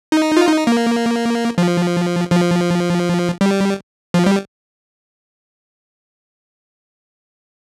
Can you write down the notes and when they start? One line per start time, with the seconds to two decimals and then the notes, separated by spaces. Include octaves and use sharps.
0.12 D#4
0.37 F4
0.48 D#4
0.67 A#3
1.58 F3
2.31 F3
3.41 G3
4.14 F3
4.26 G3